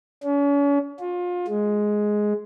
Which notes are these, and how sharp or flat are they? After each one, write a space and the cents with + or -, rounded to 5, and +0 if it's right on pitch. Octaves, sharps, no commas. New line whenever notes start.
C#4 +40
F4 +30
G#3 +5